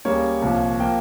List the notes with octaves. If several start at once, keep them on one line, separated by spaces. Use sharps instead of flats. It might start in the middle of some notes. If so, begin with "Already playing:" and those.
C#2 C#3 G3 A#3 C#5
C2 A#2 F3 A#3
F3 A#3 G5